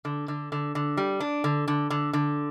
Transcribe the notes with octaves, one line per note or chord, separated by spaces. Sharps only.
D3
D3
D3
D3
G3
D4
D3
D3
D3
D3